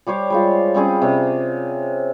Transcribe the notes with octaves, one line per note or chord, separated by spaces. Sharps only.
G3 G4 C5 C#5
G3 G#3 F4
G3 C4 C#4 G#4
C3 C#4